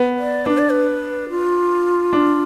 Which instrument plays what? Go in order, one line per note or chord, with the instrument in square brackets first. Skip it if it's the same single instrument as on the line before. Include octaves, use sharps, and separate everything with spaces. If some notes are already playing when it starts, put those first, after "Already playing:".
Already playing: [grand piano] B3
[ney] D5
[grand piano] D4 [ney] B4
[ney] D5
B4
F4
[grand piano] D4